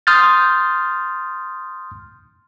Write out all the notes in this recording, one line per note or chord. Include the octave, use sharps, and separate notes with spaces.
C6 D#6 F6 G6 A6